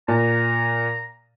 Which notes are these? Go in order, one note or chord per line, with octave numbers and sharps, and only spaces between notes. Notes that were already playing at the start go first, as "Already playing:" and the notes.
A#2 A#5